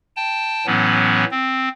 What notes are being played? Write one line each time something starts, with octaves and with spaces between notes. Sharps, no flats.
G5 A5
A2 E3 F#3 B3 C#4
C4